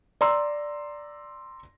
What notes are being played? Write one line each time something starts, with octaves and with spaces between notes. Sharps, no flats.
D5 A#5 C6 E6